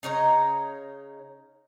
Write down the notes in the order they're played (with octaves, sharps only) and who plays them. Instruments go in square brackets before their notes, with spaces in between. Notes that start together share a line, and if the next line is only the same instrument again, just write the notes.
[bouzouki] C#3 D#4 C#5 A#5